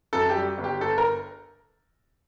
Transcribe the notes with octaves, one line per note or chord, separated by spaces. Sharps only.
F#2 A4
G4
G3
G1
G4
G1 A4
A#4